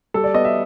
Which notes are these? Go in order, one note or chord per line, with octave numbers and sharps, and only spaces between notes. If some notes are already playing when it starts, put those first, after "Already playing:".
G3 A4
D5
B3 D#5
E5